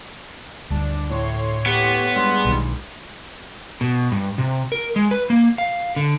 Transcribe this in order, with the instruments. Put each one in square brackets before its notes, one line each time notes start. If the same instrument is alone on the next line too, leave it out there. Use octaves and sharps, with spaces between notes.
[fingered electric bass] D2 G2 [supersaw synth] D4
[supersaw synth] A2 C#5 C6
[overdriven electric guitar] B3 [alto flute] G4
[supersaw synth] G2 G3 G#3 [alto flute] C6
[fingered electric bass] B1 D#3
[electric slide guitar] B2
G2
C3
A#4
G#3
B4
A#3
F5
D3